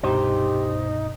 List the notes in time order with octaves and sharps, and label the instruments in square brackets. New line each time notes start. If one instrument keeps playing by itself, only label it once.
[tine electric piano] C2 G2 B2 [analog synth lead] D#4 [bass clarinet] G4 [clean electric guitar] C5